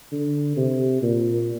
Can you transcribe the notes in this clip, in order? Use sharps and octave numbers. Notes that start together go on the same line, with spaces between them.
D3
C3
A#2